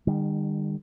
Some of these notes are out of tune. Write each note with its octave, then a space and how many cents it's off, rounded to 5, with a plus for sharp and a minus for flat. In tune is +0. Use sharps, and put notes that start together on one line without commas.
D#3 -35 G3 +35